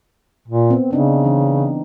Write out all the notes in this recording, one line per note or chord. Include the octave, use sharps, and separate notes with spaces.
A#2
B3 C4
C#3 C4 D4 D#4
E3 D4